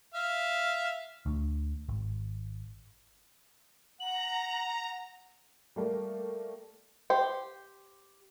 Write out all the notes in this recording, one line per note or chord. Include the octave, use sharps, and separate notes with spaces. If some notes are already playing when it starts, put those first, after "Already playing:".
E5 F5
D2
G#1
F#5 A#5 F#7
G3 A3 A#3
G4 C5